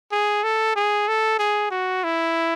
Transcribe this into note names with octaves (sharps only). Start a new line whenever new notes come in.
G#4
A4
G#4
A4
G#4
F#4
E4